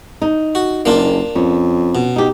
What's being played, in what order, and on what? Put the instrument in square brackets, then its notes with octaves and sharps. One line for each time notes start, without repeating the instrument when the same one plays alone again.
[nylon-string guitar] D#4
[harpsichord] F#4
[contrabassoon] F#1 [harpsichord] A#3 D4 F4
[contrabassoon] F2 [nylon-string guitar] C#4
[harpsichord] B2
[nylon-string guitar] D#4 G4